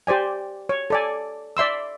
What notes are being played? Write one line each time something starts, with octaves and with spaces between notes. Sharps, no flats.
G4 C5 D5 G#5
C#5
A4 D5 G#5
D5 E5 C6 E6